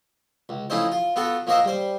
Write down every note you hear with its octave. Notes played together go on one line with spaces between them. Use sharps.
C#2
F3 A3 C#4 D#4 E4 C5
F4
B3 F4 F#4 A4
F3 A#3 F#4 C5 D#5 E5
G3 C5